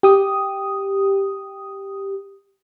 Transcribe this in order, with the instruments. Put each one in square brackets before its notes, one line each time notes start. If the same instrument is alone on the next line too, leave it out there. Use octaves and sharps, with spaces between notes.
[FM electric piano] G4 D#6